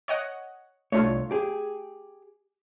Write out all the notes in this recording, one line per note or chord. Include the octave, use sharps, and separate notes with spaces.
C#5 D#5 F#5
C2 A3 D4 F4 C#5
G4 G#4